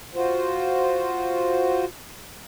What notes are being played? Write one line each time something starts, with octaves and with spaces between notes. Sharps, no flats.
F4 F#4 C5